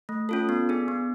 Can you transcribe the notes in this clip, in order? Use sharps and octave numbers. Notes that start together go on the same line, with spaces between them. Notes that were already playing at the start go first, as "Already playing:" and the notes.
A3
C#4 F4 A4
B3
D4 G#4
B3